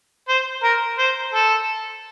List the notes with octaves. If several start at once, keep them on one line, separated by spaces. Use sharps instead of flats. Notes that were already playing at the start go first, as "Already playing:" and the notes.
C5
A#4
C5
A4